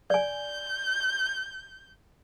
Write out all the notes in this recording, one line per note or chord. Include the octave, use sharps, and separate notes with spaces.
D5 G#5 G6